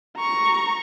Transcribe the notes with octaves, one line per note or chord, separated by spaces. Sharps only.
A#5 C#6